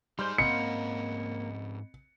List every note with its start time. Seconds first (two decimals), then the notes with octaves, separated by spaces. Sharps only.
0.19 G3 D#4 G#4 C5 C6 F6 G6
0.38 G#2 A#3 C4 C#4 D#5 F#5 B5 C#7